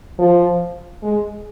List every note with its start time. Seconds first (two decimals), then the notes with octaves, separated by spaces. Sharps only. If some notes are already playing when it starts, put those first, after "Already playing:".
0.19 F3
1.02 G#3